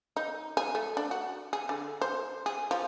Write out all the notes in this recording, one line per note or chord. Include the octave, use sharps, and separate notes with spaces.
D#4
G#4
A3
D4
F#4
G#4
D3
C5
G#4
F3